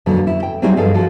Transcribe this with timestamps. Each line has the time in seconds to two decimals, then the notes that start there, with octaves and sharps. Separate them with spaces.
0.06 F2 A#2 D3 F#3
0.27 E4
0.43 G5
0.62 F#3 G3 C4 D#4 E4 G#4
0.76 G2 F3 G#4 A4 D#5 F5
0.94 F3 F#4 A4